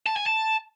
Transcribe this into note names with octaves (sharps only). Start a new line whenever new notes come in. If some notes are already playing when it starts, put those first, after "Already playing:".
A5
G#5
A5